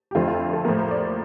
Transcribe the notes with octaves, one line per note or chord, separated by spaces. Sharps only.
G4
F2 D3 A3 C4 F4
F4
A4
A2 F3 A#3 A#4
C5
D5